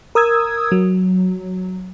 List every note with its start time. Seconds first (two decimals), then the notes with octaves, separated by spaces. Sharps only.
0.15 A#4 D#6 E6 G#6
0.72 F#3